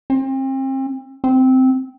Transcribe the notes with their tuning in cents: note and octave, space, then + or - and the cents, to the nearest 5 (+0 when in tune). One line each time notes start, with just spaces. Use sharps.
C4 +35
C4 -10